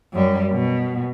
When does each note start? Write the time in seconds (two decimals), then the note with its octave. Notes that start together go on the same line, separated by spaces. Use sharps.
0.13 F#2 G3
0.51 B2